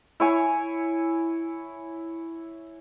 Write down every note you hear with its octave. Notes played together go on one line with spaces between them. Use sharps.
E4 C#5 G#5